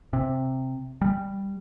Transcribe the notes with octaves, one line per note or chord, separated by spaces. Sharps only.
C3
G3